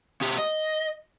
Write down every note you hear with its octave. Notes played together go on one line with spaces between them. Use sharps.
B2 G4
D#5